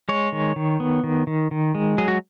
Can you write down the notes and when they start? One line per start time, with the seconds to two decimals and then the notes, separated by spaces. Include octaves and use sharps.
0.09 G#3 C#5
0.32 D#3
0.56 D#3
0.80 B3
1.04 D#3
1.27 D#3
1.51 D#3
1.75 G#3
1.98 F#3 G#4
2.08 F#4